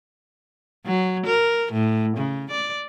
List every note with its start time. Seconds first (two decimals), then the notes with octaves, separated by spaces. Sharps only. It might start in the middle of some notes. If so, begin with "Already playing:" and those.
0.86 F#3
1.26 A#4
1.72 A2
2.17 C#3
2.51 D5